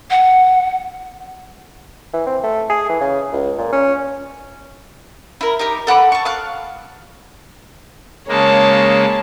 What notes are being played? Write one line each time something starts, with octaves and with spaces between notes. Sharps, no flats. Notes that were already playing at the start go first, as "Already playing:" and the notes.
F#5
E3
C4
A3
G#4
E3
C#3
C#2
A#2
C#4
E4 A#4
D#4 G4 A#4
A4 F#5 B5 D6
A5 C#6
F5 F#6
C#3 G#3 A#3 C#5 A5